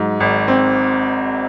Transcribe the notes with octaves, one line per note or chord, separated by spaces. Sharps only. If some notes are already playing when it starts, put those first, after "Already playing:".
Already playing: G#2 F#3
G#1
C4